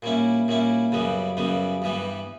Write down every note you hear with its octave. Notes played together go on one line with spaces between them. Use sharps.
A#2 G3 C#4 E4
A#2 G3 C#4 E4
F#2 C#3 G3 B3
F#2 C#3 G3 B3
G2 E3 G3 B3